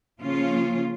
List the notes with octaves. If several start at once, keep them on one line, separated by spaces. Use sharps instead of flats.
C#3 F3 A#3 C#4 F4